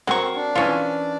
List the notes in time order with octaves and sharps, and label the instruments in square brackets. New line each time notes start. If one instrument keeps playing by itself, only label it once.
[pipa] F#3 C#6 [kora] C4 A#4
[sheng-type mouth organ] D4
[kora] E3 C#4 [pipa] F4 C#5